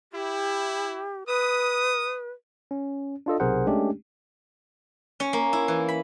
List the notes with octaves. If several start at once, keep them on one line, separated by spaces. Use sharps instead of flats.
E4 G4
B4 D#6
C#4
D4 F4 A4 D#5
B1 C3 G#4 A#4 C5 F#5
G#3 A3 C#4 D4 G4
C#4
A#3
E4
E3
B5